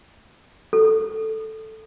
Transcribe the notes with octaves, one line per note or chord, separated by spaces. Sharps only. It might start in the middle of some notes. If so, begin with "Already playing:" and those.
A4